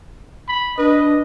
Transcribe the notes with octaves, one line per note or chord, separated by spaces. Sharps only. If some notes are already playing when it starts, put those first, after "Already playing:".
B5
D4 B4 D#5